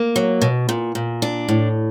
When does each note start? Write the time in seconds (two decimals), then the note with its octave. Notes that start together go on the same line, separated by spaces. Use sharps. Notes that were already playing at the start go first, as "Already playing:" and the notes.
Already playing: A#3
0.16 F#3
0.42 B2
0.69 A#2
0.95 A#2
1.22 D4
1.49 A2